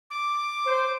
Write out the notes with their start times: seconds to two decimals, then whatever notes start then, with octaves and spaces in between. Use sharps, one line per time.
0.10 D6
0.66 C5